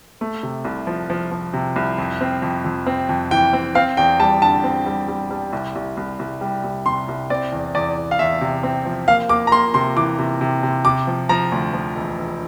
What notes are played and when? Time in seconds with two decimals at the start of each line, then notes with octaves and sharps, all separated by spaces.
0.21 A3
0.43 C3
0.65 C2
0.87 F3
1.10 F3
1.31 F3
1.54 C3
1.76 C2
1.98 F2
2.21 C4
2.42 F2
2.64 F2
2.87 C4
3.09 F2
3.31 E3 G5
3.53 C4
3.75 C4 F5
3.97 E2 G5
4.20 G3 A5
4.42 D3 A5
4.64 C4
4.86 G3
5.08 G3
5.31 G3
5.53 C2
5.75 C2
5.97 C2
6.19 C2
6.41 G3
6.64 C2
6.86 C3 C6
7.08 C2
7.30 C4 D5
7.52 E2
7.75 E2 D5
7.97 E2
8.11 F5
8.19 E2 E5
8.41 C3
8.63 C4
8.86 F3
9.08 A#3 F5
9.29 A#3 D6
9.47 A#5
9.52 A#3 C6
9.74 C3 C6
9.96 E3 D6
10.19 C3
10.41 C3
10.63 C3
10.85 C3 D6
11.07 F3
11.29 F3 A#5
11.52 D2
11.73 F3
11.96 E1
12.18 E1